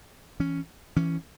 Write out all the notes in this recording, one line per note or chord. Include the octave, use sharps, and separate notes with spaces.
E3 C#4
E3 C#4